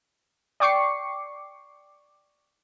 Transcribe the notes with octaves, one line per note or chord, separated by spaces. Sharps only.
D5 G5 C#6 D6 C7 C#7